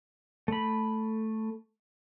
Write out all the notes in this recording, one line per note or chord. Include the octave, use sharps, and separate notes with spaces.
A3 B5